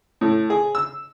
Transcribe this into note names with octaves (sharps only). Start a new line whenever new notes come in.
A2
G#4
E6